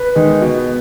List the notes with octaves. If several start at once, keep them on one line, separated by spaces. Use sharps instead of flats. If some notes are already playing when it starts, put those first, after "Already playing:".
Already playing: B4
D#3 G#3 D#4
B2